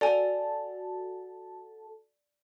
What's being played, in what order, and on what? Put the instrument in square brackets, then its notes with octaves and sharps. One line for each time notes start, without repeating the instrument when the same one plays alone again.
[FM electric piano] F#4 A4 A5 [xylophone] D5 G#5